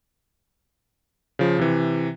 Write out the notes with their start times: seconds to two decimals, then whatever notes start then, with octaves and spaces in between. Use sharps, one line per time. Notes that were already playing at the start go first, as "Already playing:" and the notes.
1.39 C#3 F3
1.59 C3 E3